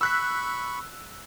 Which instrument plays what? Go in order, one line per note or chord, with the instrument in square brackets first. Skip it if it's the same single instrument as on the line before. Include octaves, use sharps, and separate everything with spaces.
[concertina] B5 C#6 [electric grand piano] E6 F#6 B6